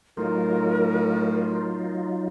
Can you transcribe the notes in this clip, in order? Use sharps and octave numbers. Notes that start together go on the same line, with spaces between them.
A2 F#3 D#4 F4 A#4